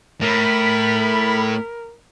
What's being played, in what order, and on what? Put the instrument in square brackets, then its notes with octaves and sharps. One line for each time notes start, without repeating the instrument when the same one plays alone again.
[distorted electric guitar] A2 [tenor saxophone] A#4 [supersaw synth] B5